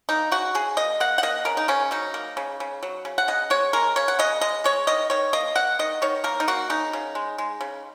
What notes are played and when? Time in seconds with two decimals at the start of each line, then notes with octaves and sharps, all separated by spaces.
0.09 A#3 D#4
0.31 C#3 F#4
0.55 C#3 G#4
0.77 A#3 D#5
1.00 A#3 F#5
1.18 F#5
1.23 A#3 D#5
1.45 C#3 A#4
1.57 D#4
1.68 C#3 C#4
1.91 F#3 D#4
2.14 A#3
2.37 C#3
2.60 C#3
2.83 F#3
3.05 C#3
3.18 F#5
3.28 C#3 D#5
3.50 G#3 C#5
3.73 G#3 A#4
3.96 C#3 C#5
4.08 F#5
4.19 C#3 D#5
4.41 G#3 D#5
4.64 G#3 C#5
4.87 D#3 D#5
5.10 D#3 C#5
5.33 A#3 D#5
5.55 A#3 F#5
5.79 D#3 D#5
6.02 D#3 C#5
6.24 A#3 A#4
6.40 D#4
6.48 A#3 F#4
6.70 C#3 D#4
6.93 C#3
7.15 G#3
7.38 G#3
7.61 C#3